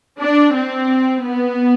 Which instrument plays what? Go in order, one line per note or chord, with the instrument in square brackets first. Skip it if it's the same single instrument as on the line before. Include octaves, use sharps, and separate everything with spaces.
[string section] D4
C4
B3